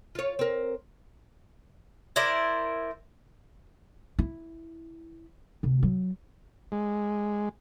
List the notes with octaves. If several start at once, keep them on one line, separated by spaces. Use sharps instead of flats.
F4 C#5
C4 A#4
E4 A#4 C5 D5
E4
D2 C3
F#3
G#3